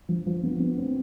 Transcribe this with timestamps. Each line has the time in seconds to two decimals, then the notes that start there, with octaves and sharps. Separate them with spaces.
0.09 F3
0.27 F3
0.43 B3
0.60 B3
0.78 C4